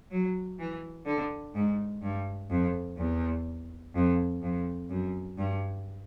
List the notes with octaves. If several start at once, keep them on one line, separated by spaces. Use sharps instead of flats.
F#3
E3
D3
G#2
G2
F2
E2
F2
F2
F#2
G2